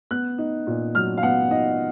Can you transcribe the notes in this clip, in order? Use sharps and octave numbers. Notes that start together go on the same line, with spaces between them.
B3 F#6
D#4
A#2
F#3 F6
F5
B3 F#5
D#4 D#5